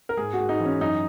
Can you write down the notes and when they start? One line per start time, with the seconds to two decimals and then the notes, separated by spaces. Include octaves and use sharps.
0.09 A#4
0.17 G#2 G#4
0.33 F#4
0.39 G#2
0.49 D#4
0.60 E3
0.65 C#4
0.81 F#2 D#4